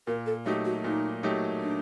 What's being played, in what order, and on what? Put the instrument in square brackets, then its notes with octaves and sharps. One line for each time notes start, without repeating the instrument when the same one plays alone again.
[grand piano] A#2 [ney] A#4
[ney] A4
[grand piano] F#3 A3 D#4 G4 [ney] F#4
[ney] F#4
[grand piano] A#2 [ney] D#4
[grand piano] F#3 A3 D#4 G4
[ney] D4